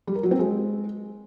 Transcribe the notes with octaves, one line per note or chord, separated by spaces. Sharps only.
G3
A#4
F#3
C4
G#3